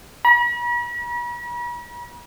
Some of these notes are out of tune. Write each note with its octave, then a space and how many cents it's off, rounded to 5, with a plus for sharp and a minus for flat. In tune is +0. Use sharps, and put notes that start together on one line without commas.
B5 -45